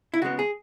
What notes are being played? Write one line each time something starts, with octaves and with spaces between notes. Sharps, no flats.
E4
C#3 G#3 B3 F#4
G#4